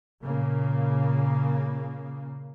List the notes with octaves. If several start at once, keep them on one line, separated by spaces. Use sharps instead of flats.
A#2 C#3 A#3